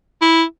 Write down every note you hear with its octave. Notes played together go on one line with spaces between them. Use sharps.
E4